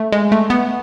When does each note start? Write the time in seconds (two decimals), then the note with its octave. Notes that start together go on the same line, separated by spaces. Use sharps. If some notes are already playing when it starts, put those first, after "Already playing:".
Already playing: A3
0.12 G#3
0.32 A3
0.50 B3